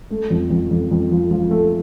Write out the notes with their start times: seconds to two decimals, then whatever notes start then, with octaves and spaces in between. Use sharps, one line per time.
0.11 A3
0.30 F2
0.50 F2
0.71 F2
0.91 F2
1.12 F3
1.31 F3
1.51 A3